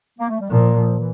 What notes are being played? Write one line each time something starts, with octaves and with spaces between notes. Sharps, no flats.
A#3
A3
G3
A#2 F3
F3
E3